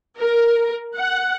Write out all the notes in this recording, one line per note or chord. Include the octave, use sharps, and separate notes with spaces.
A#4
F#5